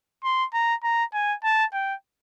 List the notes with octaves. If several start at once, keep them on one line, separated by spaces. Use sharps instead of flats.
C6
A#5
A#5
G#5
A5
G5